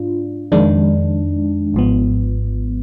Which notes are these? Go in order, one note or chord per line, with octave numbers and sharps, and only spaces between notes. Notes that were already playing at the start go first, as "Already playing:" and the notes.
Already playing: G#2 D4 F4
F2 D#3 G#3 D4
G#1 G#2 F3 B3